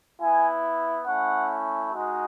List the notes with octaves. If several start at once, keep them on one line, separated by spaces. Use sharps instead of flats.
B3 E4 G#5
A3 C#4 E4 F#5
G#3 D#4 F#4